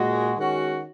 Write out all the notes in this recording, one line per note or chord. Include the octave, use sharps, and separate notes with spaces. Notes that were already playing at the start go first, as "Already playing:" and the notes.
Already playing: A#2 G#3 F#4
D#3 G#3 C#4 F#4